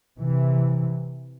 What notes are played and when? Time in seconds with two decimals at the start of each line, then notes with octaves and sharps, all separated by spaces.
0.20 C3 E3